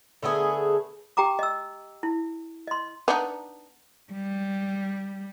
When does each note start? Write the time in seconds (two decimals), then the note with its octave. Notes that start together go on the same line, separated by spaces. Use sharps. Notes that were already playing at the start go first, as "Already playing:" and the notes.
0.23 D3 A3 B3 G#4
1.17 G4 G5 A#5 D6
1.39 D#5 E6
2.03 E4
2.67 D#5 C6
3.08 B3 D4 D#4
4.12 G3